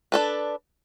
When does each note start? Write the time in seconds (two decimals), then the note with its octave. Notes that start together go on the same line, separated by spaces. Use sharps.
0.12 D4 A4 B4